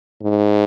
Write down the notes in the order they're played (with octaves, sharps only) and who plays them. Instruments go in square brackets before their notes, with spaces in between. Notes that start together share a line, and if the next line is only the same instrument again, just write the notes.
[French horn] G#2